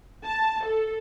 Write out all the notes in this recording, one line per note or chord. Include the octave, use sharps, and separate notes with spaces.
A5
A4